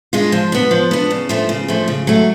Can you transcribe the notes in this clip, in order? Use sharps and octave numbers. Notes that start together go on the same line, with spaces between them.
G#3 D4 F4
F3
B3 D4
F3
B3 D4
C#3
F3 A3 D4
C#3
F3 A3 D4
C#3
F#3 A3